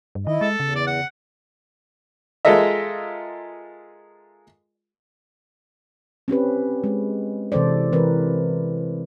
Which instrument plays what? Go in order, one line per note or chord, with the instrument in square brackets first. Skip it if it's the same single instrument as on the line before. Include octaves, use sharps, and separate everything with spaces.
[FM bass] G2
[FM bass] D#3 [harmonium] E4 D#5
[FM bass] G#3 [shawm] A4
[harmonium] E2 [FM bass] C#3
[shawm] D5
F#5
[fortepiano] G#3 F4 A4 A#4 D#5 E5
[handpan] C4 C#4 G4 B4
G#3
C3 E3 A4 C5 D5
E3 C4 A#4 B4